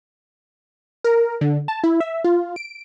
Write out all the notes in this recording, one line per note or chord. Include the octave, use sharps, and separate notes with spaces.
A#4
D3
A5
E4
E5
F4
D7